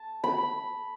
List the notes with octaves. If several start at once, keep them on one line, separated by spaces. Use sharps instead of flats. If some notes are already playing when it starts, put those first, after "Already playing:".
Already playing: A5
B5